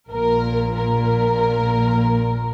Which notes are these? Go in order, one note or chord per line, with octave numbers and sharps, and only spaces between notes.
A#1 A#2 A#4
A#4